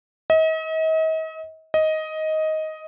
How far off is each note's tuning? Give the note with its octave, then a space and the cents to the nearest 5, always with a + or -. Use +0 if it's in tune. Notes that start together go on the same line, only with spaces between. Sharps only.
D#5 +40
D#5 +10